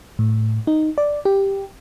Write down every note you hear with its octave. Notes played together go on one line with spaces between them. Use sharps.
A2
D#4
D5
G4